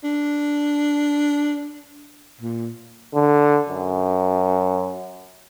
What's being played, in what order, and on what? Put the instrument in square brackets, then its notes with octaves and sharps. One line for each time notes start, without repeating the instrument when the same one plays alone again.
[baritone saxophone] D4
A#2
[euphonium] D3
F#2